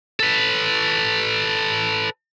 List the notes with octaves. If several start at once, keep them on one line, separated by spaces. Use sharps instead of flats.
A4 B4